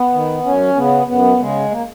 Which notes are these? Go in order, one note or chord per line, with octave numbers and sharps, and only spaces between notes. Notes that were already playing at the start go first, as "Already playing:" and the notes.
Already playing: B3
D#3
F#2 C#4
C#3 B3
F#2 B3
C#3 G#3
A#3